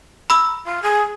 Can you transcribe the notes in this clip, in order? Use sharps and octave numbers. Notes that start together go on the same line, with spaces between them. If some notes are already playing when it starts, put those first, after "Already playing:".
A#5 B5 E6
F4
G#4